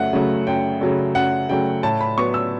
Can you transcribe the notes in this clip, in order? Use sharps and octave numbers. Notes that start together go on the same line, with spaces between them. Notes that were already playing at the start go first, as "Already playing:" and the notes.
Already playing: F#2 C#3 A3 F#5
C#3 F#3 A3
F#2 G5
C#3 F#3 A3
F#2 F#5
C#3 F#3 A3 G5
A2 A5
B5
F#3 B3 C#6
E6